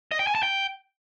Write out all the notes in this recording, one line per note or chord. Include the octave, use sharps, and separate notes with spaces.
D#5
G5
G#5
A5
G5